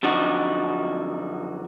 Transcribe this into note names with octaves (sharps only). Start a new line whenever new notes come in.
F#2 D3 F3 D#4 F#4